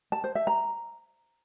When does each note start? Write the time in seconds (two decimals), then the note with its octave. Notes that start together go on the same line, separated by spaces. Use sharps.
0.12 A5
0.24 C5
0.35 E5
0.47 A#5